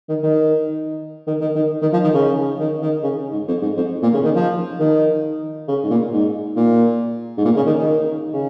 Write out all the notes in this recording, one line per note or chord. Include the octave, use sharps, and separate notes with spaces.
D#3
D#3
D#3
D#3
D#3
D#3
F3
D#3
C#3
D#3
D#3
C#3
G#2
F2
G#2
F2
A#2
C#3
D#3
F3
D#3
C#3
G#2
A#2
G#2
A#2
G#2
A#2
C#3
D#3
D#3
C#3